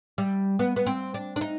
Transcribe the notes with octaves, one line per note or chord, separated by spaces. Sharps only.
G3
B3
B3
C4
D4
D4
D#4